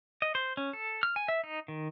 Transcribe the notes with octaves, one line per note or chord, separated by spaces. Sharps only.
D#5
C5
C#4
A4
F6
G#5
E5
D#4
D#3